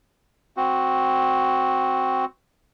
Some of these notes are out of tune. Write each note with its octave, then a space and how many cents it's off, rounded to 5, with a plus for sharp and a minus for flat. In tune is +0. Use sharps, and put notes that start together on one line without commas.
C4 +0 F#4 +0